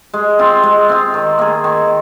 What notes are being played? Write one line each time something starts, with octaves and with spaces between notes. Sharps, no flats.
G#3
C4 F4
G#3
C4 F4
D#3
A#3 G#4
D#3